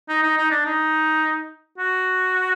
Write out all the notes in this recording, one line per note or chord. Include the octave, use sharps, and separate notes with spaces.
D#4
D#4
D#4
D4
D#4
F#4